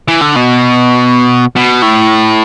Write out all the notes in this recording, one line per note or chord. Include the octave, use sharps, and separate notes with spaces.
E3
D3
B2
B2
A2